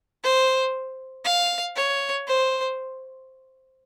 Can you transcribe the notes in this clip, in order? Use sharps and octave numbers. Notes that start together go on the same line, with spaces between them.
C5
F5
C#5
C5